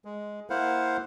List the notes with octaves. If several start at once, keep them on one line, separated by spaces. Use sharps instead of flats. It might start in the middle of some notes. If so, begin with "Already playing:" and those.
G#3
A#3 E4 C5 F5 F#5